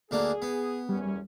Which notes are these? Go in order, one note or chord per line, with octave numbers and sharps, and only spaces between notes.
D2 A#3 D4 G#4
B3
F#1 E2 G3 C#4